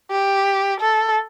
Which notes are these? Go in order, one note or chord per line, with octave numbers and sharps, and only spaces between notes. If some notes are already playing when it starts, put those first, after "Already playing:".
G4
A4